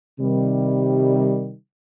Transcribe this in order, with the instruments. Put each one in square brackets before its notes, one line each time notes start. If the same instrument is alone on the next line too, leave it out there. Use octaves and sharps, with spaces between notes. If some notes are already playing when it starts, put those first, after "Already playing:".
[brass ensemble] C3 D#3 G3